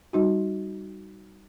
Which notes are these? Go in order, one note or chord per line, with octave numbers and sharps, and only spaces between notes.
G3 D#4 F#4